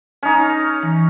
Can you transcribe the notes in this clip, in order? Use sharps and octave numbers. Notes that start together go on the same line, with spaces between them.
C#4 D#4
E3